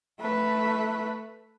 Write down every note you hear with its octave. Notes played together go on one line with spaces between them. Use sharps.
A3 B4